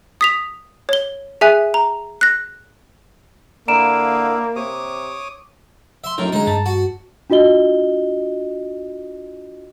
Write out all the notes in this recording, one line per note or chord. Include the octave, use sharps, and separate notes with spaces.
D#6 B6 F7
C#5 G7
G#4 E5 G#5 F#6
A#5
F#6 A#6
D3 A#3 E4 F5 A#5 D7 E7
C3 C#5 D6 D#6
E5 C6
F#2 A2 D#4 A#4
D3 G#3 D#4 G#4
G2 A5
F#4
D4 F4 F#4 D#5 G7